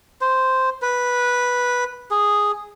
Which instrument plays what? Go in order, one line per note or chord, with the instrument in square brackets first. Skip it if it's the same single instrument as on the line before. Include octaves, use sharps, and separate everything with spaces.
[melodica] C5
B4
G#4